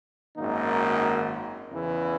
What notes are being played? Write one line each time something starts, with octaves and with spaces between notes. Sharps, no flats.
G#1 F#2 D#3 A#3 D#4
E2 C#3 E3